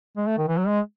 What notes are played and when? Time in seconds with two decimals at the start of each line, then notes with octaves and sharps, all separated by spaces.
0.17 G#3
0.27 A3
0.38 D#3
0.48 E3
0.58 F#3
0.68 G#3